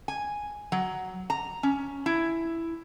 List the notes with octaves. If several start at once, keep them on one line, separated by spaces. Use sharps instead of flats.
G#5
F#3
A#5
C#4
E4